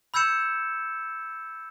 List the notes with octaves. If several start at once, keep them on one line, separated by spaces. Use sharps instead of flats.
B5 E6 G6 G#6 C#7 E7